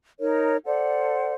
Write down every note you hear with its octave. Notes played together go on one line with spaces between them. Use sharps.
D#4 A#4 C#5
A4 C5 D5 F#5